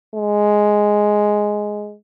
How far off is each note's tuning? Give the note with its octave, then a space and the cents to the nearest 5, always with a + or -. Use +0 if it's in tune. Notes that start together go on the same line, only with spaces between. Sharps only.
G#3 +5